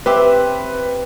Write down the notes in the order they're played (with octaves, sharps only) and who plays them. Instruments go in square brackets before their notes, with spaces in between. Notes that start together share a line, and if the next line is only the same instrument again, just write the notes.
[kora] C4 G4 E5 [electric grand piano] B4